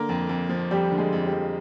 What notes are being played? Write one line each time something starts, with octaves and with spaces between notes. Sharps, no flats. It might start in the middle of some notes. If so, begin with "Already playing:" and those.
Already playing: D3 A#3 A#4
F2
F2
F3
F2 G3 G4
D3
G#3 G#4
F2
G3 G4
F2